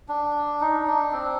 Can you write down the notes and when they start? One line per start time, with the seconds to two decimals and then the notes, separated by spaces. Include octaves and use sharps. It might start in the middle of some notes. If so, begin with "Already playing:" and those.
0.09 D4
0.60 D#4
0.87 D4
1.12 C4